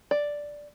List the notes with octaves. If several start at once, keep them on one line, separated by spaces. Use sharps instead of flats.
D5